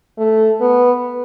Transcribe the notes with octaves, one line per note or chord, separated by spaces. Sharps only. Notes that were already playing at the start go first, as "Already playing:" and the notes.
A3
B3